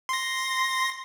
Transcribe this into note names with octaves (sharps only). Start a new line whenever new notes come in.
C6 A#6